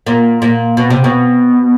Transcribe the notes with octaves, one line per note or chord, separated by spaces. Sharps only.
A#2
A#2
B2
C3
B2